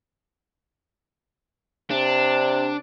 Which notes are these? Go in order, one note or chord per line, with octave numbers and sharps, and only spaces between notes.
C3 D4